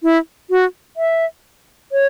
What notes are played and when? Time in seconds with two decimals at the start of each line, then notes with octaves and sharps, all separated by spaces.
0.03 E4
0.50 F#4
0.97 E5
1.92 C#5